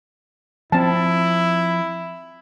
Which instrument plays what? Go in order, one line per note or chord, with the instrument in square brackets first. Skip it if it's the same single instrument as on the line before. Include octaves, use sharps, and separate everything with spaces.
[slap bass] F3 [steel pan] C4 A5 [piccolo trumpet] E4